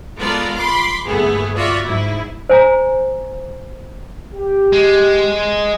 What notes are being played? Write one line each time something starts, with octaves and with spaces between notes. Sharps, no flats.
G#3 B3 F4 A4 A#4 D5
B5 C6 D6
G1 D#2 A3 B3 G#4
F4 F#4 D5 E5
G#2 E4
C5 G#5 A#5
G4
G#3